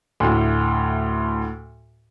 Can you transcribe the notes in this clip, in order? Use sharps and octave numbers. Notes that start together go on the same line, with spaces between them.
D2 A2